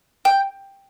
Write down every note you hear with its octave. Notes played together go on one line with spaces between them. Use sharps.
G5